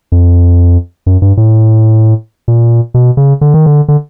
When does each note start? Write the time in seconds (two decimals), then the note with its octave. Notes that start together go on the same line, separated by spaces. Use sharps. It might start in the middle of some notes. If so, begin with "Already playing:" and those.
0.12 F2
1.06 F#2
1.22 G2
1.37 A2
2.48 A#2
2.94 B2
3.17 C#3
3.41 D3
3.54 D#3
3.66 D3
3.88 D3